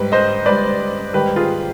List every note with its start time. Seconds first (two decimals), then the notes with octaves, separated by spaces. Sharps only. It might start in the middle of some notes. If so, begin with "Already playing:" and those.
Already playing: G#2 G3 B4
0.12 C5 D#5
0.46 G#2 G3 B4 D5
1.14 G#2 D#3 G3 G4 B4
1.36 F4 G#4